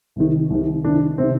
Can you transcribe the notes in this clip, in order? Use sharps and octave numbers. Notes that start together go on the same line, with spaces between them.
C2 C3 D#3
C2 C3 D#3
C2 C3 D#3 D4
C3 D#3 C4